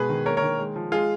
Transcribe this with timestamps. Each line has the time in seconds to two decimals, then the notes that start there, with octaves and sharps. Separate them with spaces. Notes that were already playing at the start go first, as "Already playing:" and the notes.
Already playing: B2 G#3 G#4 B4
0.09 D#3
0.26 A#3 A#4 C#5
0.37 A#4 C#5
0.42 D#3
0.59 G#3
0.76 F3
0.92 G#3 F4 G#4